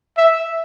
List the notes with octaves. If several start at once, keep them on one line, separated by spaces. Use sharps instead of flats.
E5